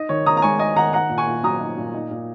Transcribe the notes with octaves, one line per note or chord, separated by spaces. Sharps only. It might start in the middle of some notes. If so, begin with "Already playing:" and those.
Already playing: D#4 D#5
D#3 C#5
D#3 A#5 D#6
A#5
G#3 G#5 C#6
D#4 D#5 G#5
D#3 F#5 A#5
D#4 F#5 A#5
A#2
G#5 C#6
A#2
F#3 A#5 D#6
D#4
A#2
D#4
A#2